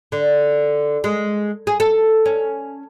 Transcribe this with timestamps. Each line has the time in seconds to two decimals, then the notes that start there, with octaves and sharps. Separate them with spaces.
0.12 D3
1.04 G#3
1.67 G#4
1.80 A4
2.26 C#4